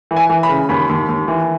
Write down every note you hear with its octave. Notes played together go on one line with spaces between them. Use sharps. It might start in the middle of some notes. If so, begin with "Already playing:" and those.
E3
G#5
E3
B5
C#3
D#2 B5
D#2
D#2
E3